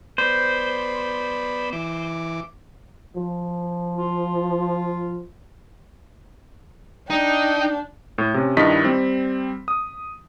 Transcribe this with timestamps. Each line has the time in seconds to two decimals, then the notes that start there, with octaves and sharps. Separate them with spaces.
0.18 B3 C5 D5 B5
1.73 E3 D6
3.17 F3
3.97 F4
7.10 D4 D#4 G5
8.18 A2
8.34 C3 C#4
8.57 G2 D#3 E4 F4 D#5 B6
8.84 G3 C4
9.68 D#6